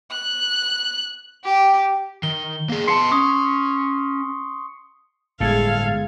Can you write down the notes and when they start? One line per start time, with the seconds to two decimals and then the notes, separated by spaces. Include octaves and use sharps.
0.12 F#6
1.44 G4
2.23 D#3 G7
2.70 A#3 G#4
2.87 B3 A5 C6 C7 C#7
3.11 C#4 C#6 D#6
5.40 G1 A2 G#3 A4 F5 G#6